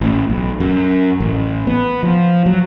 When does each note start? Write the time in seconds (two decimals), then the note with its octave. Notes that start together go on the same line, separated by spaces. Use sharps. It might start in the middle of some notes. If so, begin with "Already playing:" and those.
0.01 A1
0.30 B1
0.60 F#2
1.20 A1
1.67 B3
2.03 F3
2.46 F#3